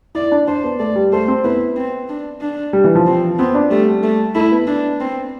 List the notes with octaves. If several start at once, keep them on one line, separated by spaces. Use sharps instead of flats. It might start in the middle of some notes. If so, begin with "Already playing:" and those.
E4 D5
D4
D4 C5
B3
A3 D5
G3
A3 C5
C4
B3 E4
C4
D4
D4
G3
E3
F3
C4
B3 C4
D4
G3 A3
A3
A3 E4
B3
D4
C4